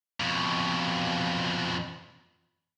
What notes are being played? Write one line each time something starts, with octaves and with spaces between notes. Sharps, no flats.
F2 B2